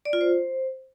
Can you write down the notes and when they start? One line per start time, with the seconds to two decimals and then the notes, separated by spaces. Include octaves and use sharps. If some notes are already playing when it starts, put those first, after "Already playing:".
0.05 D5
0.13 F4
0.21 C5